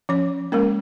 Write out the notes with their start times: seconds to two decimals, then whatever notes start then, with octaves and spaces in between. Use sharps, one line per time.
0.09 F3 C#4 C#5
0.52 G#3 A#3 C#4 A#4